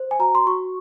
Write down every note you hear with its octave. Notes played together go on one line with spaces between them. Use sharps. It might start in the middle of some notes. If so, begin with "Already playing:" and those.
Already playing: C5
G#5
F#4 A#5
C6
F#4 C#6